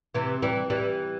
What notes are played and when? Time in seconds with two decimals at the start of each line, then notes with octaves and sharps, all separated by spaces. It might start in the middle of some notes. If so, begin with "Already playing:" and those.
0.15 C3 E3
0.42 E3 G3
0.70 E3 G3